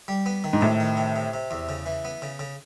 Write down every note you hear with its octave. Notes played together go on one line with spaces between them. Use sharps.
G3
B3
D#3
G#2
A2 C3
D#3
C3
C3
C3
E2
C#3
E3
B3
C#3
C#3